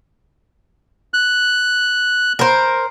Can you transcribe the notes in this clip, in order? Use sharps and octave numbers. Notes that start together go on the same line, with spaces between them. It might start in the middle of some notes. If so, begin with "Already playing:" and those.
F#6
A#4 C5